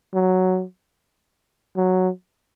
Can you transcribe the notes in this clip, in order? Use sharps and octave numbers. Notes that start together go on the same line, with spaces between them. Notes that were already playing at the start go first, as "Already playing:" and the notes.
F#3
F#3